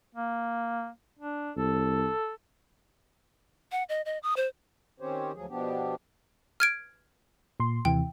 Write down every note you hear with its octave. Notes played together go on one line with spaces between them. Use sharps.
A#3
D4
C2 A4
F#5
D#5
D#5
D#6
C5
D#3 C4 C#4 G4 C5 C#5
D2 F3 F#3 G#4
B2 F3 B3 D4 G4
F6 G#6 D7
A#2 C6
D#2 C3 E3 G5